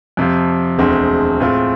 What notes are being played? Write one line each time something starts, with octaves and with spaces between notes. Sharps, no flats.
F2 C3 F3
E1 D2 D3 G#3 C4
A2 G#3 C4 F4